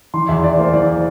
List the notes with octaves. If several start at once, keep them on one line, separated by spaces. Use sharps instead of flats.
E3 C6
E2 E5
E2 D5
A#3 C5
E3 D5